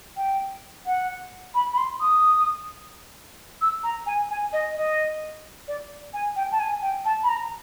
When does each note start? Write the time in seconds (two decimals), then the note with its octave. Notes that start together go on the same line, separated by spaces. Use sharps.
0.17 G5
0.86 F#5
1.54 B5
1.73 B5
1.78 C6
2.01 D#6
3.62 E6
3.84 A#5
4.07 G#5
4.31 G#5
4.53 D#5
4.77 D#5
5.68 D5
6.14 G#5
6.36 G5
6.52 A5
6.60 G#5
6.82 G5
7.05 A5
7.23 B5
7.29 A#5